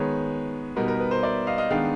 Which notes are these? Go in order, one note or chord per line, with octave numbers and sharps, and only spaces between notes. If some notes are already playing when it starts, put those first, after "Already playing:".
Already playing: D#3 G#3 B3 B4 C#5
B2 G3 B3 D#4 A#4
A#4
B4
A#4 C5
D5 E5
D#5 F5
D#5 F5
D#3 G#3 B3 D4 F5 G5